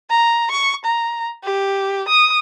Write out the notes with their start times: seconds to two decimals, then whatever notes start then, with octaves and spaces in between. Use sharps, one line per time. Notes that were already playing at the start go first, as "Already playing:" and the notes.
0.10 A#5
0.51 C#6
0.85 A#5
1.44 G4
2.09 D#6